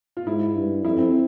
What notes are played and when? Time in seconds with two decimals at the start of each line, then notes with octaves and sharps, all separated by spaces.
0.17 F4
0.26 G#2 E4
0.55 G2
0.84 F2 E4
0.99 C4